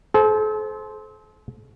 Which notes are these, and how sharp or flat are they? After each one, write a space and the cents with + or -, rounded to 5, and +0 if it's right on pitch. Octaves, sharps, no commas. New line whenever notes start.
A4 -40 C5 +0